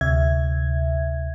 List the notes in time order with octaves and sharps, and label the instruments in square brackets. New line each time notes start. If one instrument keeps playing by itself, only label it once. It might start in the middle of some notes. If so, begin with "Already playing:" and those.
[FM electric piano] D2 C3 E5 G#6